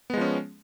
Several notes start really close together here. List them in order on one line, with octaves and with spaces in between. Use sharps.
B3 G#3 F3 C#4